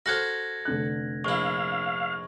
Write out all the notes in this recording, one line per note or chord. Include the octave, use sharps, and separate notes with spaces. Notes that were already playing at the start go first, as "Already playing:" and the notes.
F#4 A4 C5 F6 F#6 G#6 A#6
F1 D3 F#6
A#1 E4 F5 C#6